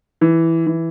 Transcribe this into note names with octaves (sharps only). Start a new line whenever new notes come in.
E3
E3